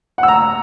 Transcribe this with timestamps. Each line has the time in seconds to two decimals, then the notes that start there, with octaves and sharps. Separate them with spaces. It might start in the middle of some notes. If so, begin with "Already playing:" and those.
0.18 F#5
0.23 E6
0.28 A#5